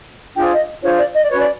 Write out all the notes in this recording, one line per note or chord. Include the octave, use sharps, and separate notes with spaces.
D4 F4 G#4 C5 G5
D#5
D4 F4 G#4 C5 C#5
D5
D#5
D5
C#4 F#4 B4 C#5
D5